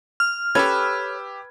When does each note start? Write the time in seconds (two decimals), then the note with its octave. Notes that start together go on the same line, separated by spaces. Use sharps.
0.20 F6
0.55 C#4 G4 A4 B4 E6 G#6